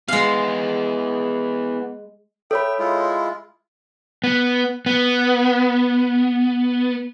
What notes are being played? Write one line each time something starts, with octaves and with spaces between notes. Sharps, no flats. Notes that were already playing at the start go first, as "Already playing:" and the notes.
G#3 B3 G#4 F5
A4 C#5 E5 G5 B5
G#3 E4 F4
B3
B3